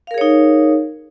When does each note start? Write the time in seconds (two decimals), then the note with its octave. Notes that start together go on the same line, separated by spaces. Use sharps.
0.07 F5
0.11 A#4
0.14 G#4
0.18 C#5
0.21 D#4